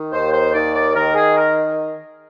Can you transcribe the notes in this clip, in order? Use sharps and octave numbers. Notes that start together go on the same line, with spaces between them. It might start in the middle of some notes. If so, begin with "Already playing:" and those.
Already playing: D#3
D#2 C5
C5
D#3 D5
D5
D#3 A#4
G#4
A#4